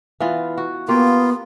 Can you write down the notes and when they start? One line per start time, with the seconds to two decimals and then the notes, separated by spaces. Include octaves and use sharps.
0.20 E3 B3 F4
0.57 F#4
0.88 A#3 B3 F4 G4